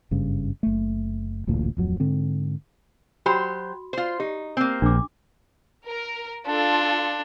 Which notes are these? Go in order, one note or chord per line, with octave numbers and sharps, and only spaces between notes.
F#1 G2 C#3
F#1 A3
D1 A1 D2 A#2
D1 F2 F#3
G#2 D3 C4
F#3 F#4 G4 C5 B5 C6
F4 C5
D#4 G4
A#3 C4
A#1 D4 D6
A#4
D4 F4 A4